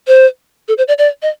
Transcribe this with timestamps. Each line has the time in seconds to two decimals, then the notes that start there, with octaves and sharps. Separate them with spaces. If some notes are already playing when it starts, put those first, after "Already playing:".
0.07 C5
0.68 A4
0.78 C5
0.88 D5
0.98 D5
1.22 D#5